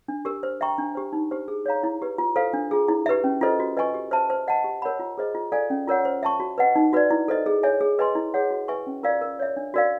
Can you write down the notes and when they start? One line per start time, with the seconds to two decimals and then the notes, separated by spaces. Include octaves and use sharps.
0.08 D4
0.25 G4 A#4
0.43 C5
0.61 E5 G5 A#5 C#6
0.78 D4
0.95 G4 C5
1.13 D#4
1.31 G4 C5
1.48 G#4
1.66 C#5 F5 A#5
1.83 E4
2.02 G4 B4
2.18 F4
2.36 A4 C5 F5
2.53 D4
2.71 F4 G#4
2.88 E4
3.06 G4 B4 E5
3.24 C#4
3.41 F4 A4 C5 D#5
3.60 F#4
3.77 B4 D#5 G#5 C#6
3.94 G4
4.11 C5 E5 A5
4.30 C5
4.48 D#5 F#5 A5
4.64 G4
4.82 A#4 C#5 F#5 B5
4.99 F4
5.18 G#4 C5 D#5
5.35 F4
5.52 A4 D5 F5 G#5
5.70 C#4
5.88 F4 A#4 C#5 F#5
6.05 C5
6.23 E5 A5 C#6
6.40 F#4
6.58 B4 D#5 F#5
6.76 D#4
6.93 F#4 B4 D5
7.11 E4
7.28 A4 C5 D#5
7.46 G#4
7.63 C#5 E5 G#5
7.81 G#4
7.99 B4 D#5 G#5 C6
8.15 E4
8.34 G#4 C#5 F#5
8.51 F#4
8.68 B4 E5 G#5 C#6
8.87 C#4
9.03 F4 A#4 D5 F5
9.21 A#4
9.39 C#5 E5
9.57 D4
9.74 F#4 A#4 D5 F5